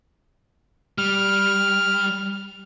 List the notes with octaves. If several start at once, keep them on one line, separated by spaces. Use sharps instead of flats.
G3 F6